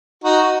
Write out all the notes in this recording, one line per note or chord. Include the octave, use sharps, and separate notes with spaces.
D#4 F#4